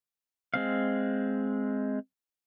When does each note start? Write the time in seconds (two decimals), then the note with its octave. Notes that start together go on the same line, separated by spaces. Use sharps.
0.54 G#3 C4 F5